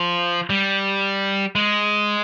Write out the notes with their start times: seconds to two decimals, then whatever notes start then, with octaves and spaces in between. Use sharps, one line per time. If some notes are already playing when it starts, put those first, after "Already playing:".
Already playing: F3
0.50 G3
1.55 G#3